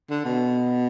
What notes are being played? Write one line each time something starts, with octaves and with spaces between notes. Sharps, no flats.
D3
B2